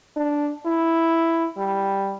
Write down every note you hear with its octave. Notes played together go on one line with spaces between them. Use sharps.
D4
E4
G3